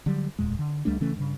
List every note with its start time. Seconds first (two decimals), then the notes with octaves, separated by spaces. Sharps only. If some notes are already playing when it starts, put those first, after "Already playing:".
0.06 D3 F#3 G3
0.39 D1 E2 A#2 G#3
0.59 D3
0.85 C#2 G3 A3 D4
1.00 C#3 E3 A3 C#4
1.16 G2 C#3